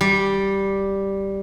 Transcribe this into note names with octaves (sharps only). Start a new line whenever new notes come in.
G3